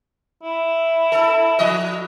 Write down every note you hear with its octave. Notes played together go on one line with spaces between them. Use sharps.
E4
A4
F3 D#5